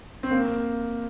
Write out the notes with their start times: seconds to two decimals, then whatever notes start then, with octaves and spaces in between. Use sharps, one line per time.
0.23 C4
0.31 A#3